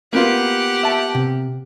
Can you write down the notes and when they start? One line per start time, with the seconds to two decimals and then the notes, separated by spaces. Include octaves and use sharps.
0.13 A#3 B3 F4 G4 F#5
0.83 E5 A5
1.15 C3